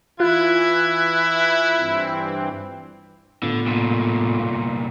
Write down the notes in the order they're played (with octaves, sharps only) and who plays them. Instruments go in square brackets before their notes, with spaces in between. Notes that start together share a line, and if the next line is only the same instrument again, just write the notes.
[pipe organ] E3 G#6 [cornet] E4 [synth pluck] F4 [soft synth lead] F#6
[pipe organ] G2 E3 C4
[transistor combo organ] A2 B3 F4 [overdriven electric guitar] D3
[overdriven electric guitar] C2 A#2